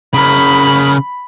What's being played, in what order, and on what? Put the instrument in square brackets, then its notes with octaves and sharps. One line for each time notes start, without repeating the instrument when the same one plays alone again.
[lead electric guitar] C#3 A#4 [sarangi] B5